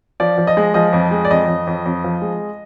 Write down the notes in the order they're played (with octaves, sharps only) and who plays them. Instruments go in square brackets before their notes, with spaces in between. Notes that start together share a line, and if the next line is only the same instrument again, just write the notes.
[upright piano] F3 D5
F3
D#5
G#3
F3 D#5
F2
G#3
D5
F2 D#5
F2
F2
F2
F3
G#3